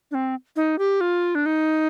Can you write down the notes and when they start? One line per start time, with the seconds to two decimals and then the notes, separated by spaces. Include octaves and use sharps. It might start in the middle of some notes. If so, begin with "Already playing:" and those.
0.11 D4
0.15 C4
0.56 D#4
0.79 G4
1.01 F4
1.35 D4
1.46 D#4